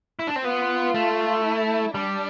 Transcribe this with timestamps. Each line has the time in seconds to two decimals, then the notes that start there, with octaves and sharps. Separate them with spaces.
0.19 E4
0.27 D4
0.36 C4
0.44 B3 F4
0.95 A3
1.45 E4
1.94 G3 D4